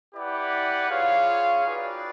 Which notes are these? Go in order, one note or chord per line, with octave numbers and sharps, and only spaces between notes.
E4 G4 B4 D5 F#5
F4 G#4 C#5 F5
D#4 F#4 B4 D5 G5